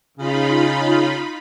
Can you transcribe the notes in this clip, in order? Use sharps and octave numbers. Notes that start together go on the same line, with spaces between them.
C#3 D#4 F4 B5